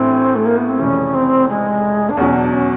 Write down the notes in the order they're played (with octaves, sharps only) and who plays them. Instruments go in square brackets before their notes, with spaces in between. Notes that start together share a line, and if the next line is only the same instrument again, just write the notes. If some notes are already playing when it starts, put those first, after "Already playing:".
Already playing: [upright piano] A1 A2 E3 A3 D4 [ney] C4
[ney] A3
A#3
B3
C4
[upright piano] F1 F2 C#3 E3 [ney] C#4
[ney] C4
G#3
D4
[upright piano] E2 B2 F#3 [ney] C#4
[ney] D4
C#4